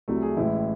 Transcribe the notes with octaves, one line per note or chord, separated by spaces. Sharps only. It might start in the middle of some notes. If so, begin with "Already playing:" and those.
C2 C3 F#3 A3 E4
G#4
A1 A2 G#3 E4